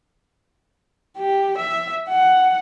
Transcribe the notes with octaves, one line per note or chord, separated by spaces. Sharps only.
G4
E5
F#5